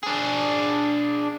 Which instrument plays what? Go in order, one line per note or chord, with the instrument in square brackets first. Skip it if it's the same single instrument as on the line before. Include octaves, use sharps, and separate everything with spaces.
[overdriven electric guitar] D4 G#4